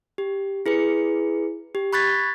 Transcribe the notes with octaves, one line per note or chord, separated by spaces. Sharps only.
G4
E4 G#4 B4 C#7
G4
B5 C#6 F#6 G#6 A6 B6